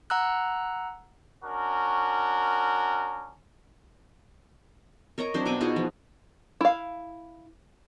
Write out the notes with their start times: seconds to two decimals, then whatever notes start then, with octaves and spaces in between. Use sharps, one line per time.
0.10 F#5 A#5 E6 F#6
1.44 C#4 D4 F#4 A#4
5.18 A#4 C#5 D#5 A#5
5.34 F#3 C4 D4 C5
5.46 B2 F5 G5 G#5
5.61 D#4 F4 F#4 G#4
5.76 F3
6.61 E4 F5